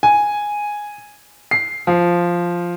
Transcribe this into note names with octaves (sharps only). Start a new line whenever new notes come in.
G#5
C7
F3